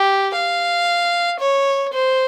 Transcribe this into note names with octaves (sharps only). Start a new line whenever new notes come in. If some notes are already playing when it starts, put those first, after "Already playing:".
Already playing: G4
F5
C#5
C5